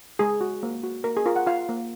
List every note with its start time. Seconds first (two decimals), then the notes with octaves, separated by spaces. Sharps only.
0.19 G#3 G#4
0.41 F#4
0.63 A#3
0.83 F#4
1.04 A#3 A#4
1.17 G#4
1.26 F4 A#4
1.36 F#5
1.46 F4 F5
1.69 A#3